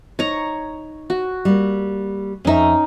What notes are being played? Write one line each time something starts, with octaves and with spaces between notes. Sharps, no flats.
D#4 C#5 A#5
F#4
G3 A#3
F2 C#4 D#4 E5